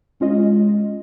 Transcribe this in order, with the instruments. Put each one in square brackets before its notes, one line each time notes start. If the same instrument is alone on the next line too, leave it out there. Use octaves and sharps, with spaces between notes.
[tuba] G#3 [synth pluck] C#4 F4 D#5